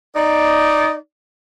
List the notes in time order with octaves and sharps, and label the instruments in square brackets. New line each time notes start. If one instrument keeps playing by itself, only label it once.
[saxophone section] D#4 D5